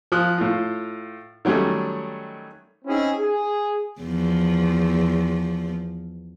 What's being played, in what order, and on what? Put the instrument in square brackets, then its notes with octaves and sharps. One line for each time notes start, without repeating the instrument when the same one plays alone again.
[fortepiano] F3 D#6 F#6
A2 F4
D#3 F#3 G3 A3 C#4
[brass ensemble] C4 C#4 D#4 E4 G#4
G#4
[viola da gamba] E2 F3